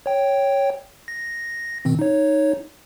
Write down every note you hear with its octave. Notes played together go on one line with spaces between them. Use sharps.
C#5 G5
A#6
B2 D#3 C4
D#4 C#5